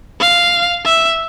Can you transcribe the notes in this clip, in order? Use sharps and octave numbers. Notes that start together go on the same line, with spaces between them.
F5
E5